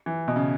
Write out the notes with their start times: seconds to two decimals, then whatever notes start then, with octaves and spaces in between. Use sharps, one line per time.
0.06 E3
0.28 B2
0.36 C#3